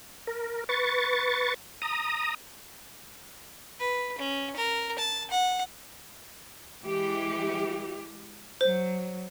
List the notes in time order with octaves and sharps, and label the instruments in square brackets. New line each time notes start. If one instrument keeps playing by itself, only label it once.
[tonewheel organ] A#4
B4 C#6 A6
A#5 D#6
[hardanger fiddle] B4
C#4
A#4
A5
F#5
[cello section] E3 G#3 G4
[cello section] F#3 [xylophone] C5